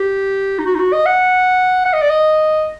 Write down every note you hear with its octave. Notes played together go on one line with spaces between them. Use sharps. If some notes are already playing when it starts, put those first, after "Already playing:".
Already playing: G4
D#4
F#4
D#4
F#4
D#5
F#5
F#5
D#5
D5
D#5